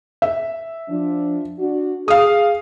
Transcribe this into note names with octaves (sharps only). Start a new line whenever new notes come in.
E5
F3 D4
D4 F#4
G#4 F5 D#6